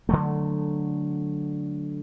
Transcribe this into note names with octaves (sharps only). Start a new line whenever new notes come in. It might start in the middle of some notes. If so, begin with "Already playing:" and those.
D3 F#3 A3